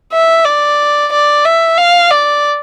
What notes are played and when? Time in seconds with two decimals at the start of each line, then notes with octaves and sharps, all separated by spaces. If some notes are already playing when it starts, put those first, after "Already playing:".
0.13 E5
0.45 D5
1.13 D5
1.45 E5
1.78 F5
2.11 D5